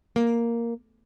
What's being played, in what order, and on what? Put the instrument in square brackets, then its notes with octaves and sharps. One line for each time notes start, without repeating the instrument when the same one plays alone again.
[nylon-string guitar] A#3